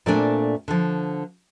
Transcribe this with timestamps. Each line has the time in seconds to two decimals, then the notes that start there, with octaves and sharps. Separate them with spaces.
0.06 A#2 A3 A#3 C4 D4 G#5
0.68 D3 F3